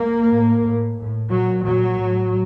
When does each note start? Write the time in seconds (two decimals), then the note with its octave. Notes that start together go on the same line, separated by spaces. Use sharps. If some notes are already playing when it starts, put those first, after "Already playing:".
Already playing: A#3
0.27 A2
0.62 A2
0.96 A2
1.30 A#2 F#3
1.64 A#2 F#3
2.00 A2